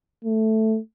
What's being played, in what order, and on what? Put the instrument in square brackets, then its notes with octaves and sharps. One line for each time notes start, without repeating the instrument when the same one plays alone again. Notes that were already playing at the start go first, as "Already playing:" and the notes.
[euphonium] A3